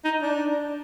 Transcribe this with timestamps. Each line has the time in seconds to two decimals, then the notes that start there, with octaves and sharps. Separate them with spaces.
0.05 D#4
0.22 D4